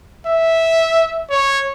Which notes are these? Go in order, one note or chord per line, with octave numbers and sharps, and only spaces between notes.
E5
C#5